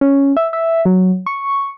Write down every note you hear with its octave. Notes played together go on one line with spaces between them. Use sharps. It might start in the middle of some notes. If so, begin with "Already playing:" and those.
C#4
E5
E5
F#3
C#6